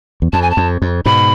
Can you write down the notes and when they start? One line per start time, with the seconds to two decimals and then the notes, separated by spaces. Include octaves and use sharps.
0.22 E2
0.33 F2 A5
0.42 G#5
0.51 A5
0.57 F2
0.82 F2
1.05 G#2 B2 B5